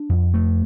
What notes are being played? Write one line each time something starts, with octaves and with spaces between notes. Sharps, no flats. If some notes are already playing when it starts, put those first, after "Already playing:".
Already playing: D4
F2
A3